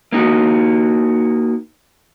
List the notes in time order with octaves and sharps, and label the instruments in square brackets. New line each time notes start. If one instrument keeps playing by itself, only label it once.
[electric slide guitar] A#3 D#4 F#4